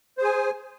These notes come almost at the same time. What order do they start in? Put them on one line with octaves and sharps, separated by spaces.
C5 G#4 G#5